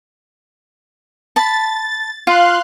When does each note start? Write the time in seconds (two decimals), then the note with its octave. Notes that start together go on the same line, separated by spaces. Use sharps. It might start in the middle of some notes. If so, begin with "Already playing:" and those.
1.36 A5 B5 A6
2.27 F4 F5 C6 F#6